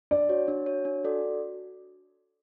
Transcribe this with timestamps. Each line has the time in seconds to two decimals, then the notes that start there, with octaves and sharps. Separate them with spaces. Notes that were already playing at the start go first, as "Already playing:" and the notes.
0.11 D4 D5
0.29 F#4 C#5
0.48 D4
0.66 F#4 C#5
0.85 D4
1.04 F#4 A4 D5